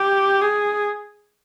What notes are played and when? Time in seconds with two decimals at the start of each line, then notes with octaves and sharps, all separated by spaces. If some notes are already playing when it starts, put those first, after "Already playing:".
Already playing: G4
0.41 G#4